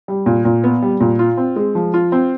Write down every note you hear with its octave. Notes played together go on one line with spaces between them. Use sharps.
G3
A#2
A#2
B3
G3
A#2
F4
C4
G#3
F3
F4
C4